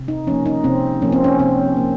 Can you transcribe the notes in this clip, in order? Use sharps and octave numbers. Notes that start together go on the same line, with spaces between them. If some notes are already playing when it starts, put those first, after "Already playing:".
Already playing: C3
D#4
F3 A#3 C#4
D#4
C3 C4
F3 A#3 C#4
C4
C#4
C3 C4
F3 A#3